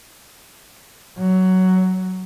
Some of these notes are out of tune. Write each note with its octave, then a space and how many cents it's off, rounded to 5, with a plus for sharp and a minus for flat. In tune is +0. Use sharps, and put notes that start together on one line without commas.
F#3 +10